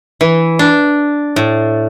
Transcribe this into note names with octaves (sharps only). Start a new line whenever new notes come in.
E3
D4
A2